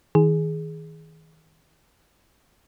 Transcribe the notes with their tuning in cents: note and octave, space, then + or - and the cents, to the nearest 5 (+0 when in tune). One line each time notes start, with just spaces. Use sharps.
D#3 +35 G#4 +5